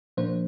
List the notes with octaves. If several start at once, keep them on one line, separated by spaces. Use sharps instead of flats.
A#2 F3 A#3 D4 C5